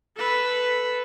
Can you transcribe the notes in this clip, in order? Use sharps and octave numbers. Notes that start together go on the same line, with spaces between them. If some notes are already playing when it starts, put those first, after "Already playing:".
A4 B4